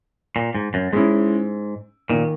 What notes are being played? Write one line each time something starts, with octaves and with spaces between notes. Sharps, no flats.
A#2
G#2
F#2
G#2 G#3 C#4 E4
A#2 D#3 A#3 D#4